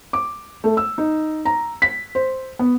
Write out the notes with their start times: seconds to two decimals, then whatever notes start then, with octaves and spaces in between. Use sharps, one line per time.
0.13 D6
0.64 A3
0.77 E6
0.98 D#4
1.45 A#5
1.82 B6
2.15 C5
2.59 B3